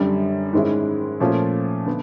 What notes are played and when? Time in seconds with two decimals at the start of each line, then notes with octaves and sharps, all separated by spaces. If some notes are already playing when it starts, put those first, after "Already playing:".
Already playing: F#2 D3 G3
0.53 G#2 D#3 G#3 C#4 E4
1.20 A#2 F3 A3 C#4 F4
1.86 D3 B3